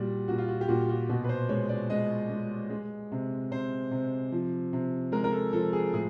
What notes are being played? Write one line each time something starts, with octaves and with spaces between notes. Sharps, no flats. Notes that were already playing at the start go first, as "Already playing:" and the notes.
Already playing: A#2 G3 F#4
A#2 F#4
F4
F#4
G4
A#2 F#4
F#4
B2 F#4
B4
C5
G#3 C#5
D5
G#3 D#5
G#3
G#3
C3
C3 C5
C3
F3
C3
G#3 A#4
A#4
A4
F3 A4
G#4
A2 G#4